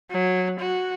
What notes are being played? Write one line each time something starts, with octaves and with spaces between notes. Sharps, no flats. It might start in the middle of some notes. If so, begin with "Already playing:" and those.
F#3
F#4